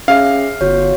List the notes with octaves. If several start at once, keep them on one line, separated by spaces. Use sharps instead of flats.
C#4 G#4 E5 F5
G1 F#4 C#5